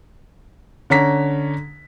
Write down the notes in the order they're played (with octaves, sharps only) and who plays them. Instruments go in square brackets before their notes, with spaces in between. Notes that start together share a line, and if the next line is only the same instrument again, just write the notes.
[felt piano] D3 C#4 A#5 B6